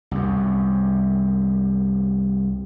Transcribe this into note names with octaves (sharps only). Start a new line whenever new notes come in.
C2 F#2